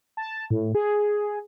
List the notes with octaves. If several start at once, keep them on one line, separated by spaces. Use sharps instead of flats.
A5
A2
G#4